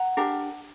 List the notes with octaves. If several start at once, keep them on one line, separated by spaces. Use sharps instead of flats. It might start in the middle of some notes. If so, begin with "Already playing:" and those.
Already playing: F#5 A#5
D4 G4 A#4